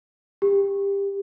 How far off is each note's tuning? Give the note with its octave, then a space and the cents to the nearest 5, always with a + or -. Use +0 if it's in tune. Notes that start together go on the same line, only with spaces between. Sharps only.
G4 +25